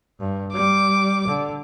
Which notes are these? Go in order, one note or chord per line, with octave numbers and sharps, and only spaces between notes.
G2
G3 D6
D3